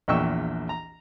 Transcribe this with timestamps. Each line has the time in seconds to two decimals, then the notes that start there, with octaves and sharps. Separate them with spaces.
0.08 A#1 E2 A#2 G5 C#6 E6
0.69 A#5